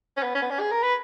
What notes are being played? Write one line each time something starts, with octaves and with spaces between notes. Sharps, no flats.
C#4
B3
C#4
B3
C#4
G#4
A#4
B4